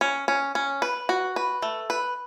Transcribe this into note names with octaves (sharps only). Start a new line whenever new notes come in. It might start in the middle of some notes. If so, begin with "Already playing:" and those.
C#4
C#4
C#4
B4
F#4
B4
A3
B4